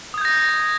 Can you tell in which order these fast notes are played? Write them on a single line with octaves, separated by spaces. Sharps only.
D#6 G#6 G6 A#6